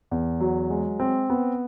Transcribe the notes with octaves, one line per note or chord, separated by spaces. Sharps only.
E2
F#3
G#3
C4
B3